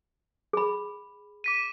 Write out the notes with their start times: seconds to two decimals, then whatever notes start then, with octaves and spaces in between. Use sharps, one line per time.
0.53 G#4 B5
1.44 D6 B6 D#7